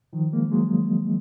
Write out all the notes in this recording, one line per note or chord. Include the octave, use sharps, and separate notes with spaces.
D#3 F3
G#3 A#3
F#3 G#3